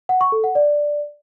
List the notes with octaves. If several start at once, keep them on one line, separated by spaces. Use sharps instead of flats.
F#5
C#6
A4
F#5
D5